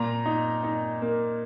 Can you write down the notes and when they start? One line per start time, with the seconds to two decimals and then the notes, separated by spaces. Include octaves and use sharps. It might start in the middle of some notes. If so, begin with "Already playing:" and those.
Already playing: A#2 A#5
0.26 D#4
0.63 D#4
1.02 A#3